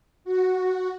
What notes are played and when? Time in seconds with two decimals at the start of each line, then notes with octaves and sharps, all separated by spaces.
0.25 F#4